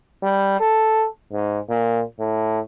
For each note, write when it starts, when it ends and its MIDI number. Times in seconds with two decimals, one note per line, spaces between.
0.23 0.55 55
0.60 1.07 69
1.33 1.59 44
1.69 2.02 46
2.19 2.59 45